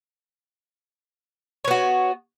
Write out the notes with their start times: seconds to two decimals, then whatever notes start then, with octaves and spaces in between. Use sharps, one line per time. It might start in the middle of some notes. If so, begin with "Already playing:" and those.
1.65 C#5
1.68 B3
1.71 F#4